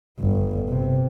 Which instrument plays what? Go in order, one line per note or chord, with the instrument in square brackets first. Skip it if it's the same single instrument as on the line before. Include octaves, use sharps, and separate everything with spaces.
[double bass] G1
C3